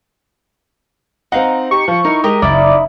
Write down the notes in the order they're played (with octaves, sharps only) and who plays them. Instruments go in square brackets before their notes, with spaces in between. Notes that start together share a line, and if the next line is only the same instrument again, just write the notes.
[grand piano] C4 F5 F#5 [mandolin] D#4
[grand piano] G4 [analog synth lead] C#6
[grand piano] F3
[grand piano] D#4 E4 [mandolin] A#4
[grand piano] G#3 [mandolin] G4 A#4 D#5
[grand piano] F#1 [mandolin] D#4 E4 [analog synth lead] D5